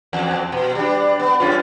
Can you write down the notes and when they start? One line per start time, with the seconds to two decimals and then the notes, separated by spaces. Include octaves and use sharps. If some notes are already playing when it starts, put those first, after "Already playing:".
0.13 E2
0.52 B2
0.75 G3 D4
1.19 B3
1.40 F#2 C#4 F4